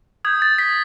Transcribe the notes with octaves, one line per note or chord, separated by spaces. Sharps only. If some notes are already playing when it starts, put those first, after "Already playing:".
D#6 G6 G#6
A6
B6